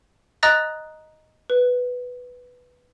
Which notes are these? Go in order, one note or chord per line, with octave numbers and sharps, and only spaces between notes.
D#5 A#5 D#6 F#6 A6 A#6
B4